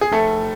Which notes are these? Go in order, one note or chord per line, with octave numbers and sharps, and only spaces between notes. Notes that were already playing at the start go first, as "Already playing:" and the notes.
G#4
F1 A3 A4